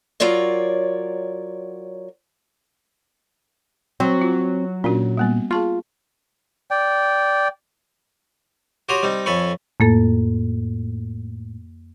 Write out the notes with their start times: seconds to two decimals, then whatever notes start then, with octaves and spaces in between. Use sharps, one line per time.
0.20 F#3 F4 A#4 C#5 D5
4.00 F#3 C4
4.21 F4
4.84 A#2 C#4 D4 F#4
5.17 G3 A#3 B3
5.51 F4 G#4 A5 C#6
6.71 D5 G5
8.89 F#4 G4 C#5 A#5 C6 D#6
9.03 G3 C4 D#4
9.26 F2 A4 C#5 G#5 B5 C#6
9.80 F2 A2 A#3 A4